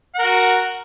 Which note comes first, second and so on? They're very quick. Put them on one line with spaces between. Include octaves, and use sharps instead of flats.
F#5 A#4 F#4